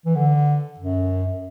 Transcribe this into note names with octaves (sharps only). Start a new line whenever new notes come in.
E3
D3
F#2